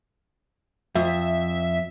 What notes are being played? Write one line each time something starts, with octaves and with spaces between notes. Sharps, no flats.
F2 E5